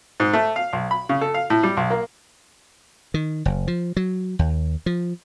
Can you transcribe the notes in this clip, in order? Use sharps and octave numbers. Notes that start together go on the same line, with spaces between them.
G#2
A3
F5
B1
B5
C#3
A4
F5
A2
G3
B1
A#3
D#3
F#1
F3
F#3
D#2
F3